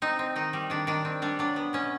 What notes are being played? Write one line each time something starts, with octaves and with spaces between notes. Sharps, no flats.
C4 D#4
C4
D#3 D#4
G3
D#3 D4
D#3 D4
C4
G3 D4
F#3 D4
B3
B2 C#4